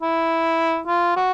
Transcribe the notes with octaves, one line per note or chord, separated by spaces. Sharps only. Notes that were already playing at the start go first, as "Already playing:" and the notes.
E4
F4
F#4